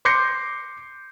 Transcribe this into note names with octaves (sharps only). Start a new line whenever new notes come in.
C6 D6 G6 A#6 C7 C#7